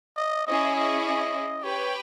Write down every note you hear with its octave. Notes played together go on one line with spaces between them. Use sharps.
D#5
C#4 E4 G#4 D#5
D#5
D#5
G4 B4 C#5 G5